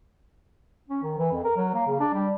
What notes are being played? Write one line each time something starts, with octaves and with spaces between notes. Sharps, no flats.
C#4
D#3
E3
F2
A#4
F#3
A#3
C#3
D4
G3